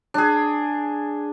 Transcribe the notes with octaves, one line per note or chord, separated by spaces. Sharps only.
D4 G#4